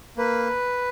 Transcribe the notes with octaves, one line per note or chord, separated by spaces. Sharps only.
A#3 B4